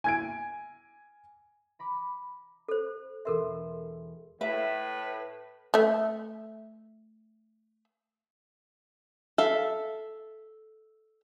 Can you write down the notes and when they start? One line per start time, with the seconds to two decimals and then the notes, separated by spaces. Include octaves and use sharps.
0.04 G#5 G#6 D7
1.79 A#5 B5 D6
2.68 A4 C5
3.25 E1 A4 A#4 E5 C6
4.41 A2 B4 E5
5.74 A3 E5
9.38 A4 E5 F5